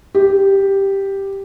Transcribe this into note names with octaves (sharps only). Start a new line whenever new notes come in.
G4